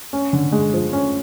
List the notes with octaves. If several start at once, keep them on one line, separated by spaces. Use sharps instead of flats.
C#4
D3
G#3
F3
C#4